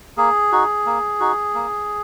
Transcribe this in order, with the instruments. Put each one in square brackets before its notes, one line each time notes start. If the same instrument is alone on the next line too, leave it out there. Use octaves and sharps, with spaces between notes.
[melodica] A#3 G#4
D#4 F#4
A#3
D#4 F#4
A#3